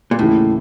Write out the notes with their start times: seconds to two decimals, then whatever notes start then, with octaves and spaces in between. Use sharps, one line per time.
0.11 A#2
0.19 D#2 A2 C#3 E3